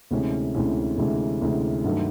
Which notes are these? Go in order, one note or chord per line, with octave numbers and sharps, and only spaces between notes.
D2 C3 E3 G#3 C#4
D2 C3 E3 G#3 C#4
D2 C3 E3 G#3 C#4
D2 C3 E3 G#3 C#4
G2 D#3 F#3 A3